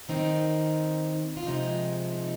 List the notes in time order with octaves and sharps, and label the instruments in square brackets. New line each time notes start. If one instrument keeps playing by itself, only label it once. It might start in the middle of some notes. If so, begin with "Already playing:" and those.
[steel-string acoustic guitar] D#3 C4 D#4
F4
C3 F3 G#3 D#4
D#4